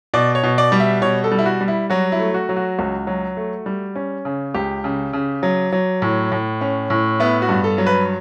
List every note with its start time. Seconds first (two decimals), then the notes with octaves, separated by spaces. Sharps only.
0.14 B2 D5
0.35 C#5
0.43 B2
0.58 D5
0.72 G3
0.80 E5
1.01 B2 C#5
1.24 A4
1.32 G3
1.39 E4
1.46 F#4
1.61 G3
1.68 E4
1.90 F#3 F#4
2.12 E4
2.19 A3
2.34 F#4
2.49 F#3
2.56 F#4
2.79 C#2
3.07 F#3
3.37 A3
3.66 G3
3.95 C#4
4.25 C#3
4.54 C#2 G4
4.84 C#3
5.13 C#3
5.43 F#3
5.72 F#3
6.02 A2
6.32 A2
6.61 C#4
6.90 A2
7.20 B3 E4
7.42 F#4
7.49 G2
7.64 A4
7.78 F#3
7.87 B4